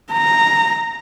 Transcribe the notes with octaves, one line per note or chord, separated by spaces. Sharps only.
A#5